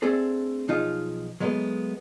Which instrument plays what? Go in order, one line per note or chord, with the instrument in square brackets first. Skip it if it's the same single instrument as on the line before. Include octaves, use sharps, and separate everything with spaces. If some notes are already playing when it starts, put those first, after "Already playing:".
[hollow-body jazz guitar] A3 C4 D4 G#4 A4
B1 F3 D#4 F4 G#4 F5
F#3 G#3 A3 B3